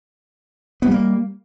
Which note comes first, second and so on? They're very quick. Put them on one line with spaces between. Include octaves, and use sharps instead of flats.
B3 G3 A#3